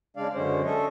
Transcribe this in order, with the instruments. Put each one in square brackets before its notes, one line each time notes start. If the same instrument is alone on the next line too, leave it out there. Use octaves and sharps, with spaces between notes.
[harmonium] C#3 G#3 D4 D5 F5
F#2 D3 G#3 C#4 C5
C#4 D4 A4 D#5 E5